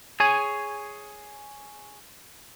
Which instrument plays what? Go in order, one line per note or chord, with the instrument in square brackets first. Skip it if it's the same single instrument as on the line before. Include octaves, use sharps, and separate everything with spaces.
[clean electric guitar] G#4 C#5 G#5